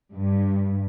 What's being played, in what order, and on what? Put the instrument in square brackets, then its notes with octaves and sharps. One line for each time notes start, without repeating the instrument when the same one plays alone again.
[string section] G2